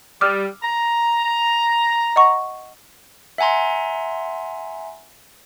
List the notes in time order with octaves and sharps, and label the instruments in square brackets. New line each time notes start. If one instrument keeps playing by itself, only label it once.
[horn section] G3 [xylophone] D6 E6 F6
[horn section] A#5
[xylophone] D#5 F#5 C#6
[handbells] E5 F#5 G#5 A#5 C6